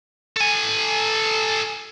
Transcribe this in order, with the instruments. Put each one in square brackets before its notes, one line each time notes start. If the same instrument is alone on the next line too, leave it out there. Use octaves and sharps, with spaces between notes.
[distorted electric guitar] A4 G#5